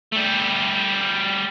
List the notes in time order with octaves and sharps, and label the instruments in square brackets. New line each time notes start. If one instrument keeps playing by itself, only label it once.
[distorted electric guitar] G3 A3